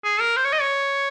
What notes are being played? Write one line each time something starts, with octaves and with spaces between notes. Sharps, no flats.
G#4
A#4
C5
C#5
D#5
C#5